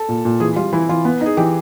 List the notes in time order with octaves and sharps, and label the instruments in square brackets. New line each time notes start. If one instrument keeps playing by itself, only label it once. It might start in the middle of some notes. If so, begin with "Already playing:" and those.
Already playing: [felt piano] A4
[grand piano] A#2
A#2
[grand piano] E3 [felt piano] G#4
[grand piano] G3 [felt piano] F4
[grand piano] E3 [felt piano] E4
[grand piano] E3 [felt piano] F4
[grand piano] B3
[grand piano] D#4 [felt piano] G#4
[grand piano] E3 [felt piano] G4